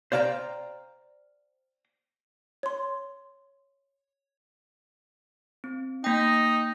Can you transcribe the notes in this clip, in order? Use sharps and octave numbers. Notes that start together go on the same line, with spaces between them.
C5 D5 F5 G5 A#5
C#5 C6
C4
A#3 D#4 G5